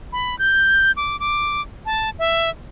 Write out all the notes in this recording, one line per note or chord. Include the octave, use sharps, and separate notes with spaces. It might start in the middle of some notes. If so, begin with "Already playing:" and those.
B5
G6
D6
D6
A5
E5